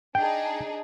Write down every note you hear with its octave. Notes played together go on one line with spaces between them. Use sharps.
D4 D#4 G#4 G5